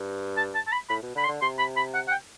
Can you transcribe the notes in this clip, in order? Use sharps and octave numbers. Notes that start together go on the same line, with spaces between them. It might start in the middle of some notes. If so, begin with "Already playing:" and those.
Already playing: G2
A5
A5
A5
B5
A2 B5
B2
D3 B5
C6
D3
C3 C6
B5
B5
F#5
F#5
G5